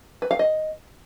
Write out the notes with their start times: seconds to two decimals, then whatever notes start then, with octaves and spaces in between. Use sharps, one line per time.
0.22 B4
0.31 F5
0.39 D#5